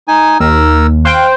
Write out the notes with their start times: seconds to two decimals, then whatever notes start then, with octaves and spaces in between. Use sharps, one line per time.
0.08 D#4 G#5
0.40 D#2 A#4 E6
1.05 C5 F5 G5 F#6